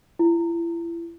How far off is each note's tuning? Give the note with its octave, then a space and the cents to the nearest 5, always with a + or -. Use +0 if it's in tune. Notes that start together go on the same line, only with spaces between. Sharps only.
E4 +35